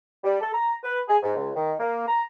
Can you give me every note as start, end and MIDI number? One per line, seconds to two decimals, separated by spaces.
0.24 0.37 55
0.41 0.49 69
0.53 0.74 82
0.84 1.00 71
1.08 1.18 68
1.23 1.32 44
1.36 1.50 37
1.56 1.73 51
1.79 2.07 58
2.07 2.22 82